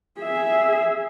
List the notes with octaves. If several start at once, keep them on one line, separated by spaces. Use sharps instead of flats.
G#4 E5